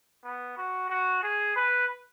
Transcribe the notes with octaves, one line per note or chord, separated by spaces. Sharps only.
B3
F#4
F#4
G#4
B4